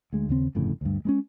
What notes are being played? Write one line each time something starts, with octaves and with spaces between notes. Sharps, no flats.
D2 G#3
D#2 C#3 C4
G1 F2 A2 C#3
D2 G2
G#3 B3 C#4